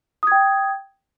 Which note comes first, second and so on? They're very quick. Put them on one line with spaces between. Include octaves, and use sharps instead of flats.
D#6 G#6 G5